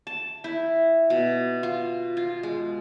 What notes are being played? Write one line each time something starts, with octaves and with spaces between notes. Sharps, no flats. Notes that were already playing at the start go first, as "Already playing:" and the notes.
A5
E4
B2
F4
F4
G#3